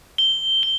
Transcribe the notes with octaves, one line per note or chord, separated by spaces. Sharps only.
G7
G7